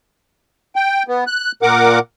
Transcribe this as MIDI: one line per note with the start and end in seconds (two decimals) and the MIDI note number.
0.76 1.03 79
1.08 1.24 59
1.27 1.52 90
1.62 1.99 46
1.62 1.99 70
1.62 1.99 78
1.62 1.99 86